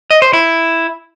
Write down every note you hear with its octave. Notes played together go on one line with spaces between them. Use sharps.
D#5
C5
E4